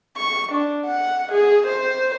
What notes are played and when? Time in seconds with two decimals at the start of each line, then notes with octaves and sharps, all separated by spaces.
0.17 C#6
0.52 D4
0.86 F#5
1.32 G#4
1.67 C5